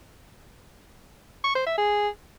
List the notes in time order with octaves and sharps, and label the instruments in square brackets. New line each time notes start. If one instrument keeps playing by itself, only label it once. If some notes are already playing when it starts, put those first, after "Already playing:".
[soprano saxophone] C#6
C5
E5
G#4